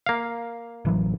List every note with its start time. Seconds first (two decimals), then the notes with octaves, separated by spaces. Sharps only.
0.06 A#3 F5
0.85 A1 E3 F#3